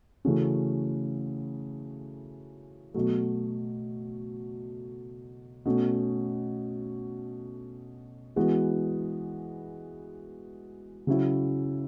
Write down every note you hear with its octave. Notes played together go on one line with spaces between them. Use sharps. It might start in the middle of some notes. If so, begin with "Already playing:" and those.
C#3 E3 A3 C#4 F#4
B2 F#3 A3
B2 A3 C#4
E3 G#3 B3 F#4
C#3 F#3 C#4 E4